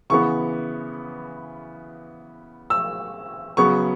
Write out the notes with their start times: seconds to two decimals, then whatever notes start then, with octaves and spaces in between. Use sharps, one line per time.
0.10 C#3 E3 B3 C#6
2.70 E6
3.57 C#3 F#3 B3 C#6